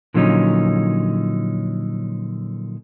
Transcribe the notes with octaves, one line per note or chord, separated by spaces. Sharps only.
A#2 D3 F3 F#3 C#4 D#4